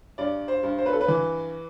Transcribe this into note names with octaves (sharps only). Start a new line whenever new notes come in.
G2 D5
C5
G2
C5
B4
A4
B4
E3